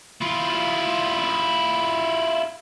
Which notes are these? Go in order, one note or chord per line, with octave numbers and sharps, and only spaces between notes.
E4 F4